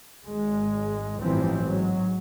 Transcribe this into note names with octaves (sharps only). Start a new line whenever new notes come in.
G#1 G#3
A1 G2 E3 F3 C4
G#2 F#3